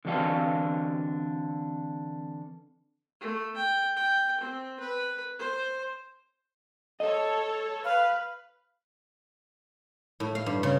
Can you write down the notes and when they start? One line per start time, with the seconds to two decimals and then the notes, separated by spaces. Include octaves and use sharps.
0.05 D3 E3 C4 D4 F#4 F5
3.21 A3
3.56 G5
3.97 G5
4.41 C4
4.80 B4
5.39 C5
7.00 A4 C#5 D#5
7.85 B4 F5
10.20 A2
10.35 F5
10.46 G2
10.63 C#3